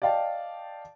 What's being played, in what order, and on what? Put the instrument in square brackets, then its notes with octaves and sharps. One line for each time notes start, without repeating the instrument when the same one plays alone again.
[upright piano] D5 D#5 F5 G5 A5